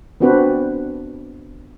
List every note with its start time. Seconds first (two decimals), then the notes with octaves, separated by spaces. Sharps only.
0.20 B3 C4 D4 F#4 B4 C5